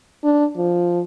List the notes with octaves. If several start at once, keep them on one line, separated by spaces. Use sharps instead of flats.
D4
F3